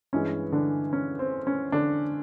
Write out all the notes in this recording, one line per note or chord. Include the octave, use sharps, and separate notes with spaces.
G2 E3 G#3 C#4
D3 D4
C#4
C4
C#4
D3 D4